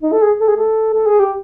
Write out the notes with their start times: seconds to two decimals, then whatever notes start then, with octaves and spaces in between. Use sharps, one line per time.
0.02 D#4
0.12 A4
0.23 G#4
0.40 A4
0.48 G#4
0.56 A4
0.94 A4
1.06 G#4
1.19 G4